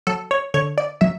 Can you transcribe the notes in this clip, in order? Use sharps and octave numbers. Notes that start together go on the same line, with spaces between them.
F#3 A4
C#5
D3 C#5
D5
F#3 E5